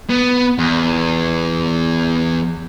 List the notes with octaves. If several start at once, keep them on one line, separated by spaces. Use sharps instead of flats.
B3
E2